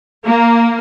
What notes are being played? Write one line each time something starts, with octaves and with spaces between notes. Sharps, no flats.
A#3